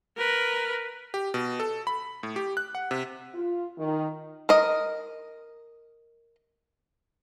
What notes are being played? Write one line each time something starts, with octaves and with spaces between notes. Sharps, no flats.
A#4 B4
G4
B2
A4
B5
A2
G4
F#6
F#5
C3
F4
D#3
A#4 D#5